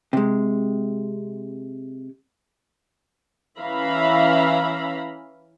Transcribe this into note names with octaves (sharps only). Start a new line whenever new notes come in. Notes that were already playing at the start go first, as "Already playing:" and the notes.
C3 G#3
E3 C#4 E5 F5 A#5 B5